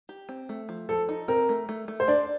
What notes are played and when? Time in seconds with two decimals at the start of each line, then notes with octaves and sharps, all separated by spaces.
0.09 G4
0.29 C4
0.49 A3
0.69 F3
0.89 F3 A4
1.09 D#4
1.28 C4 A#4
1.49 A3
1.69 A3
1.88 A3
2.00 C5
2.08 D4 D5